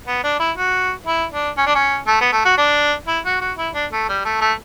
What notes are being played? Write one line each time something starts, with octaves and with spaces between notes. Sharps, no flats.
B3
D4
E4
F#4
E4
D4
C#4
D4
C#4
A3
B3
A3
F#4
D4
E4
F#4
F#4
E4
D4
A3
G3
A3
A3